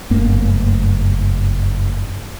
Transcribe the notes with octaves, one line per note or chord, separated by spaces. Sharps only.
F#1 G2 A3 A#3